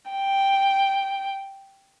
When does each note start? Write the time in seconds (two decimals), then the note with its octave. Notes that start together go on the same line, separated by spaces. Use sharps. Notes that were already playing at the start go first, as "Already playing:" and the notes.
0.11 G5